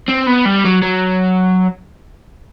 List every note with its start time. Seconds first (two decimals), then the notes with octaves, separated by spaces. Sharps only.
0.08 C4
0.27 B3
0.45 G3
0.65 F#3
0.82 F#3